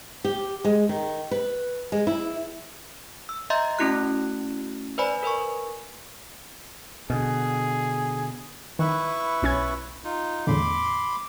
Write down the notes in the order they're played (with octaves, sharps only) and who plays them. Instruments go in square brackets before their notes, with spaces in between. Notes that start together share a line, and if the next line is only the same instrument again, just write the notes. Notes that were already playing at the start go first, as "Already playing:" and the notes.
[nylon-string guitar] G4
G#3
D#3
B4
G#3
E4
[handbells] E6
D#5 E5 A#5 C6 G6 A6
A3 C#4 E4 F#4 F#6
B4 C5 D5 G#5 B5
A#4 B4 G#5 C#6
[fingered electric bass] B2 D3 [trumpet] G#4
[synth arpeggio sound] D#3 [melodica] E4 B4 C#6
[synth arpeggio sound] B1 C#4 G#6
[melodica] D#4 F4
[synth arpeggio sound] E2 A2 D3 [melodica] B5 C6 D6